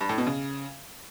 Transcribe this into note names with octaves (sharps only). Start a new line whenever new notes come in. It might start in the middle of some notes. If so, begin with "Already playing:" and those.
G2
A2
B2
C#3